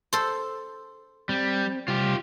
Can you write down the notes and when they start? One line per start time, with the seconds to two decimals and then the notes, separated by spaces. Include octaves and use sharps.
0.13 A4 C5
1.29 G3 C4
1.88 C3 G3 F4 G4